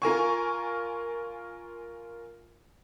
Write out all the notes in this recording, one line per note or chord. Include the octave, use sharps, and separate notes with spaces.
F4 A#4 G#5 C#6